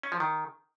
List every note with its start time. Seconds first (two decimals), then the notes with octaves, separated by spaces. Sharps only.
0.03 C#4
0.12 F3
0.20 D#3